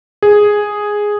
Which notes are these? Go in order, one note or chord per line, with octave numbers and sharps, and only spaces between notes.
G#4